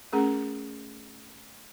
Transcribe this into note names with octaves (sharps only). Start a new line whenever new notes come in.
A3 C#4 G#4 A#4